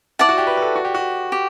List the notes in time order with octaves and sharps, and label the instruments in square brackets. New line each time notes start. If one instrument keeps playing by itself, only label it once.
[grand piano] E4 [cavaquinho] D5 F#5 A5
[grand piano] F#4
G4
B4
B4
A4
F#4
G4
F#4
[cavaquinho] G4